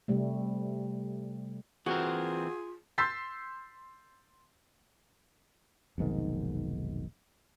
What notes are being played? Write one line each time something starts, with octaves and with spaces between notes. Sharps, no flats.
C3 G3 A3
E3 C4 F4 F#4 G#4 A#4
C6 E6 G6 A6 B6 C7
F1 B1 G#2 D#3